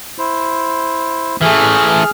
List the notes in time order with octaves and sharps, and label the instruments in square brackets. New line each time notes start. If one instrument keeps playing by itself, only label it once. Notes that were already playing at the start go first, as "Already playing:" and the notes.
[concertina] E4 C5
[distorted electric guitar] E3 A3 [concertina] G#4 F6